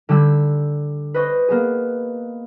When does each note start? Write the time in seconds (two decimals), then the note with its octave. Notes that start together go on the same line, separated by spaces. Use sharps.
0.09 D3 G3 E6 G#6
1.14 B4 C5 D#5 C#6 A#6
1.48 A#3 B3 G#4